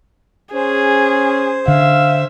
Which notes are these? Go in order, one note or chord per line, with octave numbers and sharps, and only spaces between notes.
C#4 G#4 C5
D3 E5 F5